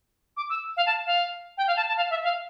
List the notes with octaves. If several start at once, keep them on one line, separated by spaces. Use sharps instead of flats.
D6
E6
F5
A5
F5
G5
F5
A5
A5
F5
E5
F5